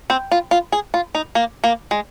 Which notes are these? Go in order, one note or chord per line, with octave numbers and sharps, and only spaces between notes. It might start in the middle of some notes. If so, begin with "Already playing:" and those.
C4
F4
F4
G#4
F4
D#4
A#3
A#3
G#3